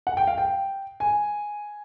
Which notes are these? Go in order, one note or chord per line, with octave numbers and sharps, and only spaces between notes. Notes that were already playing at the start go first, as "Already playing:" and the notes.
F#5
G5
F5
G5
G#5